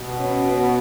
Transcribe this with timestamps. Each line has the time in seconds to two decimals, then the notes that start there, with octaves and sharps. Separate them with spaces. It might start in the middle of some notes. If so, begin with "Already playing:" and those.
Already playing: B2
0.19 C#4
0.49 B3